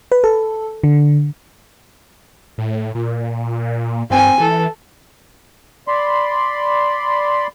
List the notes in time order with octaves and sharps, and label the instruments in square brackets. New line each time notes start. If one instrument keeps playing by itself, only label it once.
[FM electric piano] B4
A4
D3
[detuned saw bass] A2
A#2
[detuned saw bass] G2 [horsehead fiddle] C4 G#5
[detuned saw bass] E3 [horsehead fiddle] A4
[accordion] D5 B5 C6